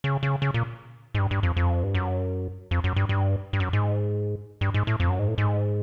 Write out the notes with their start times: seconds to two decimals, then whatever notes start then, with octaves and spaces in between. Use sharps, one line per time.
0.04 C#3
0.23 C#3
0.42 C#3
0.54 A#2
1.15 G#2
1.19 G2
1.31 G2
1.43 F2
1.57 F2
1.83 G2
1.95 F#2
2.71 F2
2.84 F#2
2.96 G2
3.09 G2
3.53 G2
3.60 F#2
3.73 G#2
4.61 G2
4.74 G#2
4.87 A2
5.00 F2
5.09 F#2
5.19 G#2
5.28 A2
5.38 G#2